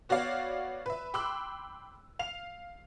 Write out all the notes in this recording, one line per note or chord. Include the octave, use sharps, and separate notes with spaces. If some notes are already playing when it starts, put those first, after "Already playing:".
B3 F#4 C#5 D5 F5
B4 E5
G5 B5 C6 D6 E6 F#6
F5 F7